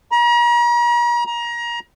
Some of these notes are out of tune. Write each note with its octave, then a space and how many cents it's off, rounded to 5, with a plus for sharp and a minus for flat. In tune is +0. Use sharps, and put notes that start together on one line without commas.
A#5 +40
A#5 +25